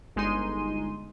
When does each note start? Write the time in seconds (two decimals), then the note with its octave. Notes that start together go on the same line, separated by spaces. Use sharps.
0.16 G1 G#3 D#4 C6 D#7